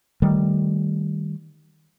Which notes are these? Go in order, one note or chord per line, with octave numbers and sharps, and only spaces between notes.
D#3 G3 A3